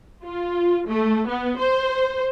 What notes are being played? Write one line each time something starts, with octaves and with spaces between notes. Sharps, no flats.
F4
A3
B3
C5